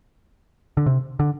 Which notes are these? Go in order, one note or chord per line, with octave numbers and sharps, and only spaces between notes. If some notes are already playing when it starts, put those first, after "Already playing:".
D3
C3
D3